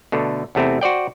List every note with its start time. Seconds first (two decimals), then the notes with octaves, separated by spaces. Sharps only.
0.12 B2 D3 A3
0.55 E2 C3 A3 C4 E4
0.81 F#4 C5 D5 G5